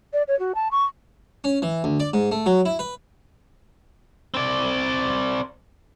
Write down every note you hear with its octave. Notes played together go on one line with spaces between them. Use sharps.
D5
C#5
F#4
A5
C#6
C#4
E3
D2
D5
G#2
A3
F#3
E4
B4
C4 D5